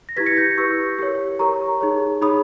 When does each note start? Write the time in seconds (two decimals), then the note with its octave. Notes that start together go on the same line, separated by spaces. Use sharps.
0.09 A#6
0.16 E4 G4 B4 G#6 B6
0.26 A#6 C#7
0.37 G6 A#6
0.57 E4 G4 B4 C#6 E6
0.99 G4 A#4 C#5
1.39 G4 A#4 C#5 A#5 C#6
1.81 D#4 G#4 C#5
2.22 D#4 G#4 C#5 B5 D#6